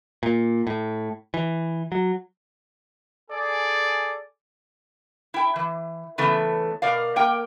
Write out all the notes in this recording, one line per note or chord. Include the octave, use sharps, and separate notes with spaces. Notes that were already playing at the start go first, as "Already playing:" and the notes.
A#2
A2
E3
F#3
G#4 A4 D5 G#5
E4 G5
E3
C#3 E3 A3 B3
B2 A#4 D5 F5
A#3 A#4 G5